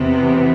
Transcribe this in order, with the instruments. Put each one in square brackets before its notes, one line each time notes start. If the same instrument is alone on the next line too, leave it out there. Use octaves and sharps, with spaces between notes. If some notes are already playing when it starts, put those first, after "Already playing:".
Already playing: [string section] E2 C3 E3 B3